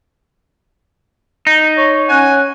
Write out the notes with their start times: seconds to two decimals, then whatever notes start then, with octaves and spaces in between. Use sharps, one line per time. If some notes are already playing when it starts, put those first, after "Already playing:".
1.47 D#4
1.78 C#5
2.09 C#4 F#5 G#5